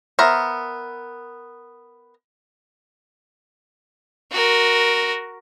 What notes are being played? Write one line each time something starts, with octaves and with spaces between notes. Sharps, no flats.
B3 A#4 C5 E5
F#4 A#4